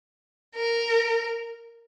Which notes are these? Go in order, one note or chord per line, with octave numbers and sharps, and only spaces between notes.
A#4